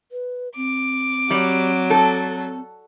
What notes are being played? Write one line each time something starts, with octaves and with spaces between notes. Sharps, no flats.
B4
C4 D6
F#3 G3
A4